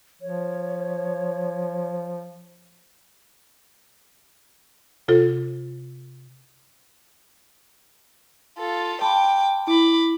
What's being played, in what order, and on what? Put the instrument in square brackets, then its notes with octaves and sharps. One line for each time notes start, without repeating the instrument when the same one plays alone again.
[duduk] F3 [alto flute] C#5
[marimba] C3 F4 A4
[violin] F4 A4
[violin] G5 D6 [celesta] A5 B5 C6
[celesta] E4 [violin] B5 D6